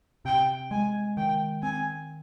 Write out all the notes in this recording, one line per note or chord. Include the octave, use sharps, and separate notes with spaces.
C3 G5
G#3 G#5
D#3 G5
C4 G#5